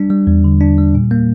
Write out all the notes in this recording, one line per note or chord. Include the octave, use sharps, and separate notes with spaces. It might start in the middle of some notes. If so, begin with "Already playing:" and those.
Already playing: G3 D4
G3
E2
D3
D4
G3
A#2
A#3